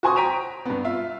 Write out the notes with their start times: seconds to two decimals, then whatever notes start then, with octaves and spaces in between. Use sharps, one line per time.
0.03 F#4 C5 G#5 C6 C#6 D#6
0.16 G5 A#5 B6 D7 D#7 F7
0.66 G2 B3
0.85 F4 E5 F5